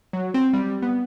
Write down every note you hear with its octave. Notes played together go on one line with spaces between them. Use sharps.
F#3
C4
G3
B3